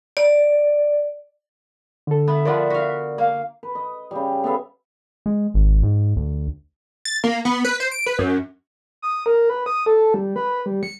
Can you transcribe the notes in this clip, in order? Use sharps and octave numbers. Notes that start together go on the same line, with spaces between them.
D5
D3 A4
B3 E5
D3 F3 B3 A#4 D5 F#5
F#4 F5
A#3 F5
B4
D#5
C#3 G3
B3 A4 E5 F5
G#3
G#1
G#2
D2
A6
A#3
B3
B4
C5
D7
B4
F#2
D#6
A#4
B4
D#6
A4
G3
B4
G3
C#7